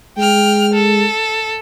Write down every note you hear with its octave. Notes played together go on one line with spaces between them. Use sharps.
G#3 G5 F6
A4